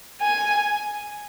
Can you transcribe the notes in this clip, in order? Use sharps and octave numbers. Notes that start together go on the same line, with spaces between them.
G#5